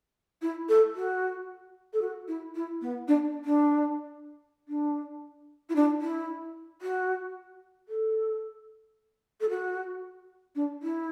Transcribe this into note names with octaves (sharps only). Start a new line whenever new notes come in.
E4
A4
F#4
A4
F#4
E4
E4
B3
D4
D4
D4
E4
D4
E4
F#4
A4
A4
F#4
D4
E4